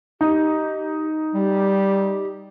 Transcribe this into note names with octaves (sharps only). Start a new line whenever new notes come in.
D#4 G4
G3 G4